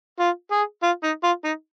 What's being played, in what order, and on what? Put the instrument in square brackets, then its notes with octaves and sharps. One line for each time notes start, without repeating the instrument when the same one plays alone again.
[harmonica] F4
G#4
F4
D#4
F4
D#4